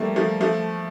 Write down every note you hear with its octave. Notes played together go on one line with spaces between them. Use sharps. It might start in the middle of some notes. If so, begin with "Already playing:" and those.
Already playing: F3 G3 A3 A#3
F3 A3
F3 A3